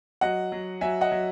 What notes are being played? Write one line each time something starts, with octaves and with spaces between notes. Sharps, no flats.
F#3 D#5 F#5
F#3
F#3 E5 G#5
D#5 F#5
F#3